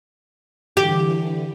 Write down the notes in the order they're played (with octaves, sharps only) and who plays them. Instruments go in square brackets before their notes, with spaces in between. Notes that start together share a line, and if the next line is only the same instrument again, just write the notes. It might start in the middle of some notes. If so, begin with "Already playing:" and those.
[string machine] D3 E3 [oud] G4